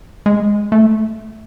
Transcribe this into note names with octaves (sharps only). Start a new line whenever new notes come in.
G#3
A3